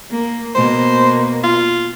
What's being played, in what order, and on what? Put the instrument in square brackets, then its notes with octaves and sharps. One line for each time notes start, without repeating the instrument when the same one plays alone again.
[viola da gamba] A#3
[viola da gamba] B2 A#3 [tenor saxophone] C5
[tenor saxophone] F4